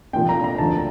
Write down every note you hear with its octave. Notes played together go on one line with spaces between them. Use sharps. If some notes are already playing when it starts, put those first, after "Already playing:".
C2 A#2 F3 G5
A#5
A#5
D2 D3 F3 A5